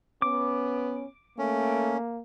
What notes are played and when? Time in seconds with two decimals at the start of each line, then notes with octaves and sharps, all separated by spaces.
0.22 B3 C#4 D6
1.38 A3 A#3 C#4